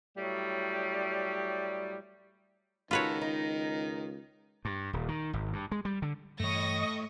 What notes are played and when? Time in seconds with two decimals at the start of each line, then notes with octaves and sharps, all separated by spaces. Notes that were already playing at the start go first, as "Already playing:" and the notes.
0.17 A2 F#3 G3
2.91 C#2 D#3 F4 F#4 A4 B4 C#5
3.21 D#4
4.65 G2
4.93 D#1
5.08 D#3
5.33 G#1
5.53 G2
5.72 G#3
5.85 G3
6.02 D3
6.40 G2 E3 A3 C#5 D#5 C#6 D#6 A#6